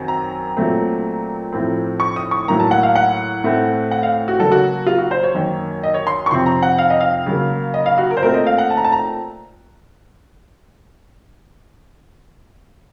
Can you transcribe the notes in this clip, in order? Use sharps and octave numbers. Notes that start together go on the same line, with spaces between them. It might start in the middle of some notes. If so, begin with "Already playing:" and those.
Already playing: F#2 D#3 F#3 C4
A#5
A#2 F#3 A3 C4
A2 F3 A3 C4
C#6
D#6
C#6
A2 F#3 A#3 A#5
A5
F#5
F5
F#5
A2 A3 C4
F#5
F5
F#4
C#3 F#3 A#3 A4
F#4
F4
F#4
C5
C#5
F#2 D#3 A#3
D#5
C#5
C6
C#6
F2 C3 F3 C4 C6
A#5
F#5
F5
D#5
F5
C#3 F#3 A#3
D#5
F5
F#4
A#4
C5
A#2 A3 C4 A#4
D#5
F5
F#5
A5
A#5
A5
A#5